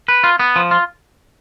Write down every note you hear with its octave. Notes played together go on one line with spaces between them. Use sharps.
B4
F4
B3
F3
F4